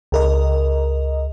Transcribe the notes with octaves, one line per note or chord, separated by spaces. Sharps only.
C#2 A#4 D#5